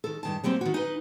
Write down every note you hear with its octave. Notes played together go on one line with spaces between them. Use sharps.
D#3 A4
G2 D#3 A5
F#3 G3 A#3 C4
D#3 F#4
D#4 B4